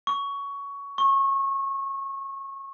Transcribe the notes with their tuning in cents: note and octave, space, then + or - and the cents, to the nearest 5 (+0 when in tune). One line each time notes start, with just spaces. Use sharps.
C#6 +15
C#6 -25